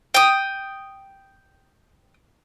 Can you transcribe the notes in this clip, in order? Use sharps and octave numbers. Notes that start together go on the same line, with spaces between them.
G5 D#6